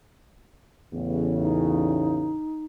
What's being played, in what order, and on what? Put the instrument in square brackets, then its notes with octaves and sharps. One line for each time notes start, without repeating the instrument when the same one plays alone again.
[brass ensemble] A1 E2 C#3
[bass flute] D#4